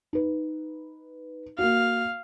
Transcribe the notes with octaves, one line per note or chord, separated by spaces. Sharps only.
D#4 B4
A#3 F#4 F5